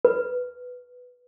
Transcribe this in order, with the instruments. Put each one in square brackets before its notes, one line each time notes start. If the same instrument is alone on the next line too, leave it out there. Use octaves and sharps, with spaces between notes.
[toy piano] B4